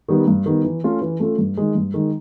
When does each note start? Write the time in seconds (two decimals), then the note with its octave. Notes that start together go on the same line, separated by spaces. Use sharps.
0.08 D#3 G3 B3
0.27 G2
0.46 D#3 G3 B3
0.64 E3
0.83 A3 C#4 F4 A4
1.01 E3
1.20 A3 C#4 F4 A4
1.38 G2
1.57 D#3 G#3
1.75 G2
1.94 D#3 G#3